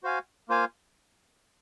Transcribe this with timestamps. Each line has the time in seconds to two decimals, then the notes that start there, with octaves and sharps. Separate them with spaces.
0.03 F#4 C5 F5 G#5
0.48 A#3 F4 C5 F5 G#5